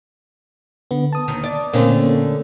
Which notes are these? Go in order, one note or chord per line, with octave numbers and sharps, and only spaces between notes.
D3 B3
A5 D#6
D#2 D#3
D5
A#2 D3 A3 A#3 C4 C#4